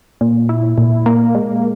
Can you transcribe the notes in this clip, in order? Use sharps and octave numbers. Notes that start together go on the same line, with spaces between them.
A#2
E4
A#2
A#3
G#3